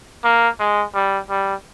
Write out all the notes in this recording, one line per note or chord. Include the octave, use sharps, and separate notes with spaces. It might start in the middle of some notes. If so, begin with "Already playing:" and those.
A#3
G#3
G3
G3